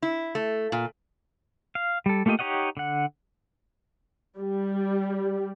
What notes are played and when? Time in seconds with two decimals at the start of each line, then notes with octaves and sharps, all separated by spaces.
0.02 E4
0.35 A3
0.72 A#2
1.75 F5
2.06 G3 A4
2.26 A3 A#3 F4 G4 D#5
2.39 D#4 G4 C#5 D#5 F#5
2.77 D3 F#5
4.38 G3